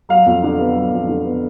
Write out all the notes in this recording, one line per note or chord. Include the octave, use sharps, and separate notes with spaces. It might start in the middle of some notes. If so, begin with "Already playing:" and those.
F#3 F5
F2
D3
B3
F#3
F2
D3
B3